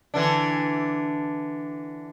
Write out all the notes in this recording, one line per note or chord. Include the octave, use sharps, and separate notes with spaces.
D3 E3 D4